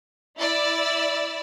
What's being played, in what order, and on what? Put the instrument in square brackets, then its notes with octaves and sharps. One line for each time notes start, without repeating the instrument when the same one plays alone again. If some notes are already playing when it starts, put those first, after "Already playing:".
[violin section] E4 D5 E6